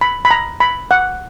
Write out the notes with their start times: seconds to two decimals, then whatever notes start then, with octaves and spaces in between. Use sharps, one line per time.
0.01 B5
0.25 B5
0.31 A#5
0.60 B5
0.91 F#5